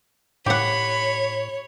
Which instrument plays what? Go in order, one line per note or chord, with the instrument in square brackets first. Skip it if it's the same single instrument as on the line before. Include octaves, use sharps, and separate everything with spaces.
[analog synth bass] A2 [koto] G4 F#5 [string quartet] C#5 [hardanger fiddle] B5